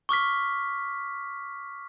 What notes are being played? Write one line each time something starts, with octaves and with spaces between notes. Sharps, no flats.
C#6 D6 F6 B6